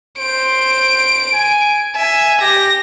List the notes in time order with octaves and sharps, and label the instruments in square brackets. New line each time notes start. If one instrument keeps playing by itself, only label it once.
[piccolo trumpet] C5 [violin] D7
[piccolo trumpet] G#5
[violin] E5 [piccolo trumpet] G#5
[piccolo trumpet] G4 [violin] A#6